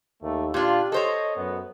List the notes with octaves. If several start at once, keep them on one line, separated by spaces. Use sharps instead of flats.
D#2 A3
A#2 D4 F4 G4
A4 C5 C#5 D#5
F#2 B3